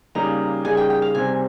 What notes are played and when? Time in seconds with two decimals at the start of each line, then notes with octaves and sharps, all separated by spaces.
0.15 C#3 G3 A#3 D#4 G#4 A#5
0.65 C#3 G3 A#3 D#4 G#4 G#5
0.77 G5
0.90 G5
1.02 F5
1.15 C3 G3 C4 G#5